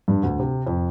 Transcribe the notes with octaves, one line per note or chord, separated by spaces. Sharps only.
G2
D2
C3
F2